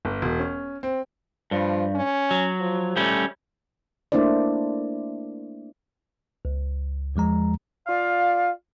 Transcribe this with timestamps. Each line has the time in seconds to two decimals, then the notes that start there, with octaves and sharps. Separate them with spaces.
0.05 G1
0.22 E1
0.39 C#4
0.83 C4
1.51 G2 F3
1.95 C#4
2.31 F#3
2.60 F3
2.96 G3 A3 C#4
4.12 A3 A#3 D4 E4 C5 D5
6.45 C#2
7.16 E2 F3 G#3 A#5
7.88 F4 D5 F5